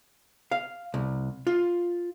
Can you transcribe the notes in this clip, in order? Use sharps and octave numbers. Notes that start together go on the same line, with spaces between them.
F5
C2
F4